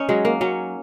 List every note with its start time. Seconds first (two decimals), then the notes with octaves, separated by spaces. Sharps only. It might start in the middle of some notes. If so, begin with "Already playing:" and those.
Already playing: C#4 D#4
0.09 F#3 G#3
0.25 A#3
0.41 F#3 C#4